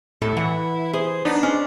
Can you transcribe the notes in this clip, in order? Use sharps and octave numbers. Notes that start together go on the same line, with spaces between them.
A2 E4 A4
E3 F#5
G#4 C5
B3 D4 D#4
C#4 C5